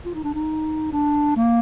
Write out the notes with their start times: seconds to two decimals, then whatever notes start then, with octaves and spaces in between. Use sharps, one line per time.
0.06 F4
0.15 D#4
0.24 D4
0.35 D#4
0.92 D4
1.37 A#3